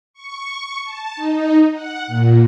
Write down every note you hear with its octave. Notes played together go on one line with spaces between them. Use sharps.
C#6
A5
D#4
F#5
A#2